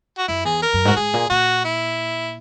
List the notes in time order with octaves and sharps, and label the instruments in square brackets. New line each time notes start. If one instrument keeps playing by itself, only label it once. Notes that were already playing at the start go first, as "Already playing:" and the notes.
[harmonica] F#4
[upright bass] F#2 [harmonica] E4
[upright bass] E2 [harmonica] G#4
[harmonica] A#4
[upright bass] F#2
[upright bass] G#2 [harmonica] F#4
[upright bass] G#2 [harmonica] G#4
[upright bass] A#2
[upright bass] A#2 [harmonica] F#4
[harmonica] E4